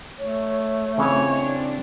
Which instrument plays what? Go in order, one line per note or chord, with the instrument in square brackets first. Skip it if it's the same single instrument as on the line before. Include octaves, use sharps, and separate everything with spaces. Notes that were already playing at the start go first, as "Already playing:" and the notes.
[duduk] A3 [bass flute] C#5
[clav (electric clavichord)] C#3 E3 E4 [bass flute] C4 [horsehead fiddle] D#4 C#5
[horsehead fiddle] D4